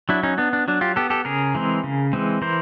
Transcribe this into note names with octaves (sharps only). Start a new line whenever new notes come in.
F#3 D4 E4
C#4 D#4
B3 D4
D4
F#3 D4
F4 G4
B3 G4 A4
G4 A4
C#3 G#4 A#4
E3 G#3 C4
C#3
E3 G#3 C4
E3 A#4 C5